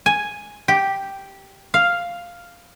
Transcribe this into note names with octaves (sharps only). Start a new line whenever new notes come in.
G#5
G4
F5